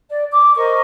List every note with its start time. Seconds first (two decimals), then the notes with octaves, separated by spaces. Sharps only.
0.10 D5
0.32 D6
0.56 A#4 C5 D#5 C#6